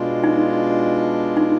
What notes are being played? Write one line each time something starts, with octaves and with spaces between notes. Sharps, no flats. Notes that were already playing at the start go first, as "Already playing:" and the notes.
Already playing: B2 G#3 D4 F4
D#4
D#4